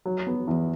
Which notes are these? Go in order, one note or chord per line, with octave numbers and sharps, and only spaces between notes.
F#3
B3
E2